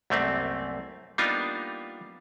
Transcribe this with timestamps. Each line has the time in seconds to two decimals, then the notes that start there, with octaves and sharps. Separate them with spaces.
0.10 C2 F#2 A3 A#3 C4
1.18 G3 A#3 B3 D4 D#4 F4